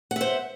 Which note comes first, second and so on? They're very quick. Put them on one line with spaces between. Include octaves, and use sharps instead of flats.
F#5 E5 C5